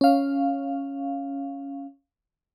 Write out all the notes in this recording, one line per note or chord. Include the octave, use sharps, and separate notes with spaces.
C#4 F5